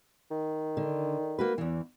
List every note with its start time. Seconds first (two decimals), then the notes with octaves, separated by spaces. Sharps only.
0.31 D#3
0.77 D3
1.39 A#3 F#4 B4
1.58 E2 E3